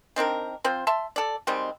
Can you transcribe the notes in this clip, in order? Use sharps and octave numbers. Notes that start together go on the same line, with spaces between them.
D#3 C4 D4 A#4
F3 C4 C5
E5 A5 C6
A4 D5
D#3 G3 G#3 C4